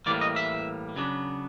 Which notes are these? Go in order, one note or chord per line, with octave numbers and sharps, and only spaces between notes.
A2 E3 G3 A#3 D5
D#5
E5
C#3 F#3 B3 D4